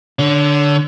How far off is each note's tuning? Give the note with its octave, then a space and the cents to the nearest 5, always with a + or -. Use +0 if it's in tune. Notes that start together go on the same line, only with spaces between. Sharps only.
D3 +0 C#5 +40